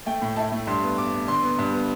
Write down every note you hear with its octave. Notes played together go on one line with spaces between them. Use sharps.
A3 G5
A2
E4 A5
A3
G2 C6
B3
B3 D6
B3
D3 C6
B3
G2
B3